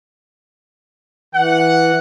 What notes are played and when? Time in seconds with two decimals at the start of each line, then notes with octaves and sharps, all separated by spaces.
1.35 E3 F#5